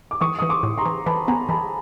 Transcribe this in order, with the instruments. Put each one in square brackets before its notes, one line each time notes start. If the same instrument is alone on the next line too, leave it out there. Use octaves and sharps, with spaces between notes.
[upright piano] D6
[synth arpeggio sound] E3 [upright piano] C#6 D#6
[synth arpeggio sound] E3 [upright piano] D#6
[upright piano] C6 D6
[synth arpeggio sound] A2
[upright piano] A#5 C6
[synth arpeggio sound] E3
[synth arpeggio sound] E3 [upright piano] A5 B5
[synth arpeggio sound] B3 [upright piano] G#5 A#5
[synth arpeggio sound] E3 [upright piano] A5 B5